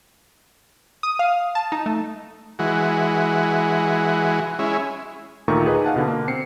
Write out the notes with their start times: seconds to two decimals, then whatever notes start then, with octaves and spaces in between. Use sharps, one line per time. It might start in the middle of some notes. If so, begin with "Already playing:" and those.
1.03 D#6
1.19 F5
1.55 A5
1.72 D#4
1.86 A3
2.59 E3 G#3 F#4
4.59 G#3 C#4 E4
5.48 D2 A#2 D#3 A3 A#5 C#6
5.65 D#4 G#4 B4 D#5
5.84 F5 F#5 A5
5.96 B2 D3
6.08 A#3
6.28 C4 C7 C#7